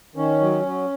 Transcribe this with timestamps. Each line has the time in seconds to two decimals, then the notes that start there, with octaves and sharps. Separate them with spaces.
0.16 D#3 C#4
0.41 F#3
0.66 F#3